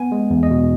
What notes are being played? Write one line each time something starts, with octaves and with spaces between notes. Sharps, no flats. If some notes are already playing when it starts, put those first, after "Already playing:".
Already playing: B3 G#5
G#3
E2
D#5
B2